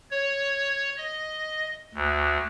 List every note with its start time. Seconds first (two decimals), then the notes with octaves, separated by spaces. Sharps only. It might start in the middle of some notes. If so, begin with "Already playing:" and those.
0.11 C#5
0.98 D#5
1.95 D2